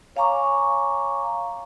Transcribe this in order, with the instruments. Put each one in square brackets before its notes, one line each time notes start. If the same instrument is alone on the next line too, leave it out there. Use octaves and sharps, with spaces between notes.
[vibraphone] C#5 F5 G#5 A#5 C#6 D6